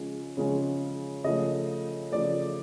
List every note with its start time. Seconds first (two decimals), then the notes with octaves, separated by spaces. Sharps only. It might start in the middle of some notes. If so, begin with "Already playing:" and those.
Already playing: C#3 F3 G#3 C#4
0.37 C#3 F3 G#3 C#4
1.24 C#3 F3 A3 D#5
2.12 C#3 F3 A3 D5